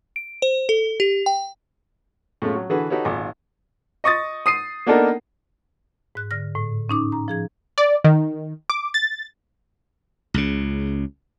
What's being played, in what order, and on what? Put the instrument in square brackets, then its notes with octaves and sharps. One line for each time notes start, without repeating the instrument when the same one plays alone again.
[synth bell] D7
C5
A4
G4
G5
[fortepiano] A2 G#3 A3 C#4 F4
F#3
D3 E3 F#4 G#4 A4 B4
D#4 F#4 G4 A4 B4 C#5
G#1 A#2 F4 G#5 D6
[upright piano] D#5 C#6 D#6 A6
D#6 C7 D#7
A#3 B3 D4 D#4 A4 A#4
[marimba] G#2 F#6
D3 F6 A#6
A2
C#4 D#4 D6
A#5
F3 G#4 G#6
[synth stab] D5
D#3
D6
A6
[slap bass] C#2 C#3